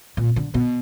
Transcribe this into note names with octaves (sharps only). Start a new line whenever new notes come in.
A#2
D3
B2